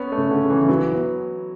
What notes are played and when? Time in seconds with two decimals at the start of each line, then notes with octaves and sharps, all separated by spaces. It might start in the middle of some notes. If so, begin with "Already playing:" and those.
Already playing: B3 C#4
0.12 A3
0.17 C#3
0.31 D3
0.44 C#3
0.50 E3
0.69 E3 F#3
0.94 B3